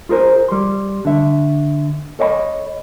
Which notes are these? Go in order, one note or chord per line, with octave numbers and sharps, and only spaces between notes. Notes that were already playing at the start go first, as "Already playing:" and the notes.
F4 G#4 A#4 C5
G3 C6
D3 E5
A4 C#5 D#5 F#5 B5